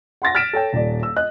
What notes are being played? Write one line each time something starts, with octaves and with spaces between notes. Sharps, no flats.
F#5 C6 A6 A#6
F6 A6 B6 D7 E7
A4 C#5 G5
D#1 D5
E6
D#5 F#6